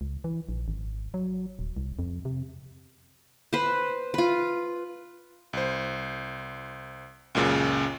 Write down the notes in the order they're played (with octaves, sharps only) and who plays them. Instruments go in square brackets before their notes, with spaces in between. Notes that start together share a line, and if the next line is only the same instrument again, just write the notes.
[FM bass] C#2
E3
A#1
G#1
F#3
D#1
C2
F2
C3
[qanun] B4 C5
F4 B4
[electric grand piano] C2 C5
C#2 F#2 A#2 C#3